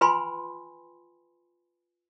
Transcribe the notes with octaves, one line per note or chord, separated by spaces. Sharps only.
F4 B4 G5 G#5 B5 C6